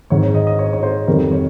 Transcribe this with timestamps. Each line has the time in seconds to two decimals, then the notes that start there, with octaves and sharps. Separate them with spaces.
0.10 G#1 G#2 D#3 C#5
0.23 C#5
0.35 D#5
0.47 D#5
0.59 C#5
0.73 C#5
0.83 C5
1.07 F2 C3 D#3 G3 A#4
1.32 C#5